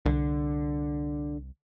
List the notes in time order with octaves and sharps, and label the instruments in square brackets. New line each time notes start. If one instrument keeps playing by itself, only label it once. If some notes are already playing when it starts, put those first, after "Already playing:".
[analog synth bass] C2 [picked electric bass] D3